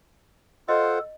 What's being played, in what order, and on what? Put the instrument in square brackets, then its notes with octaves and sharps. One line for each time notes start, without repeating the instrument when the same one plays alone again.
[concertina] F4 C5 F#5 [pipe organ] A4 [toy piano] D#5